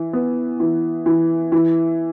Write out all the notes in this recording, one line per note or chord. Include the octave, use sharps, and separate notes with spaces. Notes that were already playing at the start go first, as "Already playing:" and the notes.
Already playing: E3
B3
E3
E3
E3